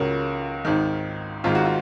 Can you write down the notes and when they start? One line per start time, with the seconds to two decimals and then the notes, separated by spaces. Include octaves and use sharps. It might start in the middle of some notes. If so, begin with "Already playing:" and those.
Already playing: C#2 C#3 F4 F#4 A#4
0.65 G#1 G#2 D#3
1.44 G#1 G#2 D#3 F4
1.55 F#4
1.65 F4